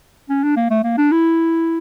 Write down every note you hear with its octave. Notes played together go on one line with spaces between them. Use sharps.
C#4
D4
A#3
A3
A#3
D4
E4